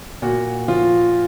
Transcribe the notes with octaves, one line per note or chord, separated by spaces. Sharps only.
A#2 F#4
F3 F4